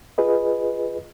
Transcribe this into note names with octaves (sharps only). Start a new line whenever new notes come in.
F4 G#4 B4 D#5